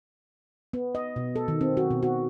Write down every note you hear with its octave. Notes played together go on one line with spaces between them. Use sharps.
B3
D#5
B2
A4
D#3
C4
F#4
B2
F#4